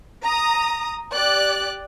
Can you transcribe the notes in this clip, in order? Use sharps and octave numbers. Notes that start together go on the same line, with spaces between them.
A#5 D#6
G4 D5 F#6